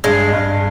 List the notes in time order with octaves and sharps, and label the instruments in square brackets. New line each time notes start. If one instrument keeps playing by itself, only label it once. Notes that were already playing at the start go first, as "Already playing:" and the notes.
[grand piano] G2 [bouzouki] G#3
[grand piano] G2